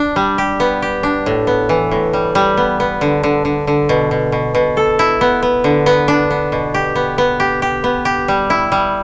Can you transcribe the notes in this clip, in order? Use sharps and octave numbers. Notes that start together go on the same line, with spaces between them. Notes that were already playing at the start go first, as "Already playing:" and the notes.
Already playing: D4
G3
G4
B3
G4
D4
A2
B3
E3
A2
G3
G3
B3
B3
D3
D3
D3
D3
B2
B2
B2
B2
A4
E4
B3
B3
D3
B3
D4
B3
B2
G4
B3
B3
G4
G4
B3
G4
G3
E4
G3